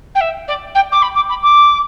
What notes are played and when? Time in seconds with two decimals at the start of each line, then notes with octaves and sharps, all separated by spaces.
0.15 G5
0.20 E5
0.47 D5
0.74 G5
0.92 D6
1.02 B5
1.15 D6
1.29 B5
1.42 D6